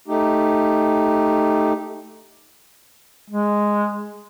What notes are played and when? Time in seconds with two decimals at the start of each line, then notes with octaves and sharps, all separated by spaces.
0.08 A3 D#4 G4
3.30 G#3